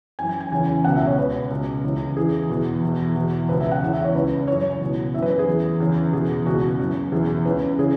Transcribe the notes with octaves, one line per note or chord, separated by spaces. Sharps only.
F#2 E3 G#5
G#5
G#5
E2 C#3 E3 G#5
C#2 B2 F#5
E5
C#5
C#2 B2 B4
C#2 B2
C#2 C#3 E3
E2 E3 G#4
E2 B2
E2 B2
E2 B2
C#2 B2 B4
E5
F#5
E2 C#3 E3
E5
C#5
C#2 C#3 E3 B4
F#2 E3 C#5
C#2 B2
F#2 E3 B4 E5
B4
G#4
E2 E3
E2 C#3 E3
E2 B2 G#4
C#2 B2 F#4
F#2 E3
E2 B2 G#4
C#2 C#3 E3 B4
C#3 E3 G#4